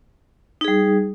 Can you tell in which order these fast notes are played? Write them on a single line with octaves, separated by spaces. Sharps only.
D#4 G#4 G3